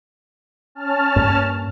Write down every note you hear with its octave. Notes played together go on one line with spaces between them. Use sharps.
C#4 A5 F6
G2 A#3